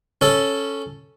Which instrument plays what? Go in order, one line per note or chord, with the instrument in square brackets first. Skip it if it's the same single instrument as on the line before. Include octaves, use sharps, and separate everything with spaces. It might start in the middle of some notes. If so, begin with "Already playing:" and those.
[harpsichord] C#4 A4